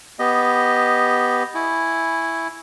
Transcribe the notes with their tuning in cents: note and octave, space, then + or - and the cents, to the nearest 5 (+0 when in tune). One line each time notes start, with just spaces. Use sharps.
B3 +0 G4 +0 D#5 +0
E4 +0 G#5 +0 C#6 +0